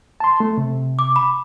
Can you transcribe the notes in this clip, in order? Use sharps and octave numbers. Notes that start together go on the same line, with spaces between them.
A5 C6
A3
C3
D6
B5